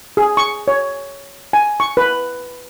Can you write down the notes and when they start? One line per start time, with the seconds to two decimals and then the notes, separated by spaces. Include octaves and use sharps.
0.17 G#4
0.37 C#6
0.68 C#5
1.53 G#5
1.80 C#6
1.97 B4